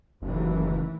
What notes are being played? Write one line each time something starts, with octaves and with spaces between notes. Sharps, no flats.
F#1 D#2 A2 E3